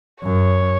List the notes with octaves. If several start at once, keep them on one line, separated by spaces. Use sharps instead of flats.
F#2 C#5